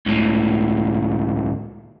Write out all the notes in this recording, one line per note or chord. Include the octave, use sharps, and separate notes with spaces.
C#2 A2